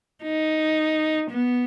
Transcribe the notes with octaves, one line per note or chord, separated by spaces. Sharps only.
D#4
B3